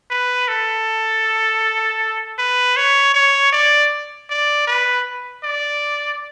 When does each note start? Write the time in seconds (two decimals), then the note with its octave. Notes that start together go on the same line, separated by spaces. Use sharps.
0.11 B4
0.48 A4
2.39 B4
2.76 C#5
3.14 C#5
3.52 D5
4.30 D5
4.67 B4
5.43 D5